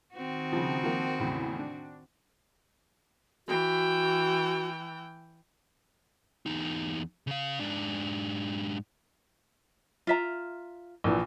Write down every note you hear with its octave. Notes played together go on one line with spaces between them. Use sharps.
D#3 C4 F#4
C#3 F3
F3 A#3
E2 A2 C#3
D4
E3 F#4 G5
E2 D#4
C#3 F5
G#2 D4
F4 E5 A#5
A#1 A#2 E3